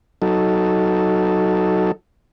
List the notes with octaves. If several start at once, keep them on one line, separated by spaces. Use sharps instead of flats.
F#3 D#4 A4